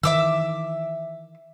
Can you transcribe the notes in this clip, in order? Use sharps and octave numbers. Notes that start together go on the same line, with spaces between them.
D#3 E3 E5 D6 E6